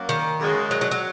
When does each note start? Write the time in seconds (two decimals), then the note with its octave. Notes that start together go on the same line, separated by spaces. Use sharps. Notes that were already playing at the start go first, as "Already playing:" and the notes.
Already playing: F#2 F#3 A#3
0.09 D#3
0.39 F#2 C#3 G#3 F#4
0.71 F#3
0.81 F#3
0.91 F#3